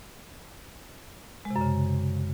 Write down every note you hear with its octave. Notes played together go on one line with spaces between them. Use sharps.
G#3
C3
F#2
C#3